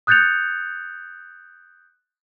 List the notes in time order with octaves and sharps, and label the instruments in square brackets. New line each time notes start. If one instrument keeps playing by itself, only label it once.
[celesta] D#6 F#6 G6 A6 C#7 F7